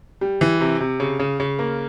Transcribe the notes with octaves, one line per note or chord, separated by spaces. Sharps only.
G3
E3
C3
C3
C#3
C#3
C#3
A#3